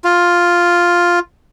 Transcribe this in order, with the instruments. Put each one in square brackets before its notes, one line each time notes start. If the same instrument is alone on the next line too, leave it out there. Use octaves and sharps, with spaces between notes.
[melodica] F4